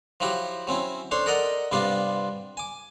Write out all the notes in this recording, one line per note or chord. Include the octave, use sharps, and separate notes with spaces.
F3 F#3 E4 F#4 G4
F#3 C4 C#4 E4
D4 A4 C5 C#5
A4 A#4 D5 D#5 F#5 A#5
G2 C3 G3 B3 D4 F4
G#5 D6